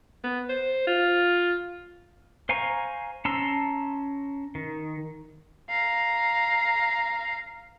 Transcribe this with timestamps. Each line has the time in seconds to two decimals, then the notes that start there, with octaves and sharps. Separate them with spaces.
0.24 B3
0.49 C5
0.87 F4
2.49 C5 F5 G#5 A#5 C#6
3.25 C#4 A5 A#5 C6 E6
4.55 D#3
5.70 F5 A#5